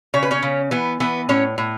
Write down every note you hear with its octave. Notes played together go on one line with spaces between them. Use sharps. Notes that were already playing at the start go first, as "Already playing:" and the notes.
C#3 C#5
B4
C#4 C#5
C#3
E3 B3 B4
E3 B3 B4
A2 C#4 C#5
A2